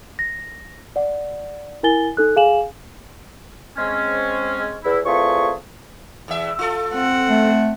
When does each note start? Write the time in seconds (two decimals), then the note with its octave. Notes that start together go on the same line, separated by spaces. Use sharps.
0.19 A#6
0.96 D5 F#5
1.83 E4 A#4 G#5 A6 G7
2.17 D#4 A4 F#6
2.36 G#4 F5 G#5 E7 F#7
3.77 G#3 C4 C#4
4.84 E2 E4
5.06 E2 A3 C4 F4 G#4 C#6
6.28 E2 E5
6.59 F4 A4
6.94 C4 F#5
7.29 A3